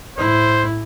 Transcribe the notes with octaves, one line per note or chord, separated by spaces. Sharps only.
A2 E4 C5